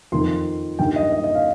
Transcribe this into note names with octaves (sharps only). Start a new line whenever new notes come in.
F2 D#3 C6
G2 D#3 G5
D#5
D#5
D#5
F5